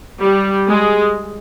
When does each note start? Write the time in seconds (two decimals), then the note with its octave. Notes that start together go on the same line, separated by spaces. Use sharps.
0.22 G3
0.68 G#3